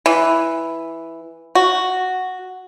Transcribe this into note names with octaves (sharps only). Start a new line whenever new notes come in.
E3
F#4